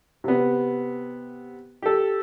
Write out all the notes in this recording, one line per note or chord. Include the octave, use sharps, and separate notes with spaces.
C3 B3
G4 A4